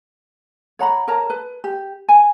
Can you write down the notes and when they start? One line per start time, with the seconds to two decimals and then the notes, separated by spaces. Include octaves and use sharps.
0.79 C#5 F#5 A#5 B5
1.08 A#4 C#5 A5 A#5
1.30 B4
1.64 G4
2.09 G#5